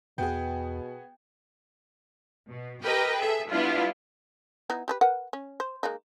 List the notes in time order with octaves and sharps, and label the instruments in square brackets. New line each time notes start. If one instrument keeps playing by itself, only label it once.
[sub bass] E2 [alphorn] B2 [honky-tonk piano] B3 F#4 G#4 [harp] G5
[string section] B2
G4 A#4 B4 D#5 G5
G#4 A4 E5
G3 B3 D4 E4 F4
[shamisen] B3 D#4 E4
G4 G#4 B4
A#4 B4 F#5
C#4
C5
G#3 A#3 D#4